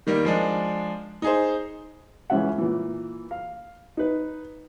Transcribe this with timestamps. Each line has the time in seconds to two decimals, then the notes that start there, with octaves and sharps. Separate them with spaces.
0.07 D#3 G3 A#3
0.25 F3 G#3 D4
1.22 D#4 G#4 C5
2.30 C#2 E3 C#4 E5 F#5
2.58 A#2 E3
3.31 F5
3.97 D#4 B4